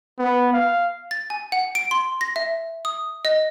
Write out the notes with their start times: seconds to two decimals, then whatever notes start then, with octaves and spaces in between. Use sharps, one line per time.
0.19 B3
0.53 F5
1.11 A6
1.30 G#5
1.52 F#5
1.75 D7
1.91 C6
2.21 A#6
2.36 E5
2.85 D#6
3.25 D#5